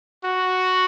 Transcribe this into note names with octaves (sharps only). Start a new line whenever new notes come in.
F#4